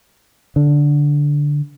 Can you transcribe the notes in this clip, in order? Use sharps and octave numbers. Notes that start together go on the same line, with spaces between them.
D3